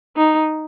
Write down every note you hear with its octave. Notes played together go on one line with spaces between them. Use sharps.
D#4